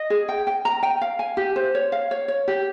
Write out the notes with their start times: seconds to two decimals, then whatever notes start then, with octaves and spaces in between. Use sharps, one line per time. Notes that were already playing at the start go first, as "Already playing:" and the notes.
Already playing: D#5
0.10 G#4
0.29 G5
0.47 G5
0.65 A#5
0.83 G5
1.02 F5
1.19 G#5
1.37 G4
1.56 C5
1.75 C#5
1.92 F5
2.11 C#5
2.28 C#5
2.48 G4